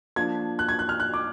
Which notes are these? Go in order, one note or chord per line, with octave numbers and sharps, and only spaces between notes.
F3 A#3 D4 G#6
F#6
G#6
F#6
F6
F#6
D6